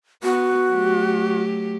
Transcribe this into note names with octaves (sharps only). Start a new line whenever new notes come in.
B3 F#4
F#3 A3 G4